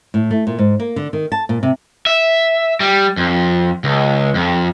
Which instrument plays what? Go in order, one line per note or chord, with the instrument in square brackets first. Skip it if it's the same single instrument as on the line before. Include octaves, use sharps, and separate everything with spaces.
[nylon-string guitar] A2
A3
A#2
G#2
A#3
D3
D#3
A5
A#2
C3
[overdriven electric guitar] E5
G3
F2
C#2
F2